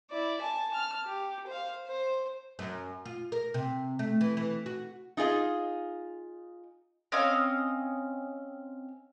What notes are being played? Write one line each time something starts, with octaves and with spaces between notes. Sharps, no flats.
E4 D5
G#5 A5
A5 F6
G4
C5 F5
C5
F#2
F4
A#4
C3
A3
E3
E3
F#4
D#4 F4 G#4 D#5
C4 C#4 D#5 F5